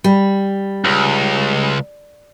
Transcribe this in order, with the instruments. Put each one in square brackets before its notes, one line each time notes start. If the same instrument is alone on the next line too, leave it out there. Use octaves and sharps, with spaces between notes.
[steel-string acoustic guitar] G3
[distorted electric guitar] C#2